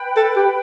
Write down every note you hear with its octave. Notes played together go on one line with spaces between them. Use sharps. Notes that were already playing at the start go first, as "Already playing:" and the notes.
Already playing: B4 G5 B5
A4
G4